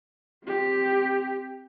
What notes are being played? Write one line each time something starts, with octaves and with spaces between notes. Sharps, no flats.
C4 G4